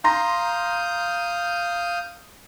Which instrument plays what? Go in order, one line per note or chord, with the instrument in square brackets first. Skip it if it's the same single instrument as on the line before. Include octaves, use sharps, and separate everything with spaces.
[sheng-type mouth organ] F5 D#6 G6 [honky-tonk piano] A#5 C6 A#6